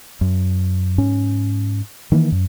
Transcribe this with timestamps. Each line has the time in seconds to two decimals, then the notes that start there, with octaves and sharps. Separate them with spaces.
0.21 F#2
0.98 G#2 C#4
2.12 D#3 E3 A#3
2.32 F#2